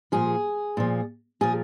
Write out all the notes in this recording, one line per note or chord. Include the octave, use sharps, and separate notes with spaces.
A#2 F3 G#4
A#2 F3
A#2 F3 G#4